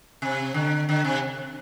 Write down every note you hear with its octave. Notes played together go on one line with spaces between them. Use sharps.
C3
D3
D3
C3